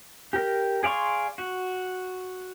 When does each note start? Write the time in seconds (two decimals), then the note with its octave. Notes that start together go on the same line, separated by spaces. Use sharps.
0.33 G4 A#4
0.83 G#4 D5 F5 C6 C#6
1.38 F#4